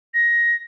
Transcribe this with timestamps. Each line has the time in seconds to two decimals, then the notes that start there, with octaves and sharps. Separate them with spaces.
0.14 A#6